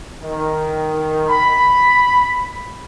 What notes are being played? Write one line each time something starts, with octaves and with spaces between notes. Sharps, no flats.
D#3
B5